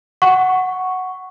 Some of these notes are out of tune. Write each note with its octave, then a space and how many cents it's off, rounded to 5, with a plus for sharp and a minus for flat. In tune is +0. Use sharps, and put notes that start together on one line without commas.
F#5 +0 C#6 +0